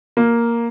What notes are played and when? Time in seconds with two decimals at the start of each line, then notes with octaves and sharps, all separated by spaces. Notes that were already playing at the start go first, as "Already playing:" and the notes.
0.17 A#3